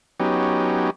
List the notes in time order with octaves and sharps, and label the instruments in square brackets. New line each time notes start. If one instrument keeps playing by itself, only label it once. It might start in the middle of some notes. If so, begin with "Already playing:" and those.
[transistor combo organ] F#3 B3 C#4 D#4 G4